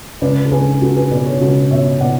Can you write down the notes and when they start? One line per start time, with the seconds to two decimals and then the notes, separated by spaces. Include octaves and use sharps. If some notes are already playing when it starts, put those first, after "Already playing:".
0.21 C#2 B4 D5
0.45 A4
0.51 C#2 G#4 B4
0.81 C#2 F#4 A4
0.96 G#4 B4
1.11 B2 B4 D5
1.26 A4 C#5
1.41 C#2 F#4 A4
1.71 B2 C#5 E5
2.01 B2 D5 F#5